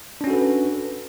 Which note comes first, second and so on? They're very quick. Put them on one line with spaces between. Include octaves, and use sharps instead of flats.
D4 C#4 F#4 A4 B4